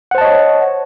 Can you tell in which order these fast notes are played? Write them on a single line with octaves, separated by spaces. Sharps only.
F#5 C5 A5 D#5 C#5